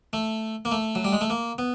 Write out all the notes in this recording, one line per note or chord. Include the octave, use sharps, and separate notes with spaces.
A3
A#3
A3
F#3
G3
G#3
A3
A#3
B3